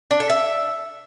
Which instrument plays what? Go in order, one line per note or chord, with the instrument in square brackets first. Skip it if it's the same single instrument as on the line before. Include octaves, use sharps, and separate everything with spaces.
[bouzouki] D4
A4
E5